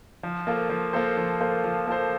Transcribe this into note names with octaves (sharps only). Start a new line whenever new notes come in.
F3
A#3 F4 A4 C5
F3
A#3 F4 A4 C5
F3
A#3 F4 A4 C5
F3
A#3 F4 A4 C5